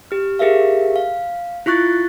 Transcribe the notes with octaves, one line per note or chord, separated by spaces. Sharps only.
G4 F6
G4 G#4 A#4 E5 F5
F5
E4 F4 C#6 F#6 A6